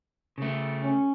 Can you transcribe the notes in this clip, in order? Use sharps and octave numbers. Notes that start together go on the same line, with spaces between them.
C#3 A3
C#4